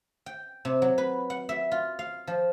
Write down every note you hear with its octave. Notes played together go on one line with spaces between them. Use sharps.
G5
C3
F#3
B4
F#5
E5
F4
F5
F3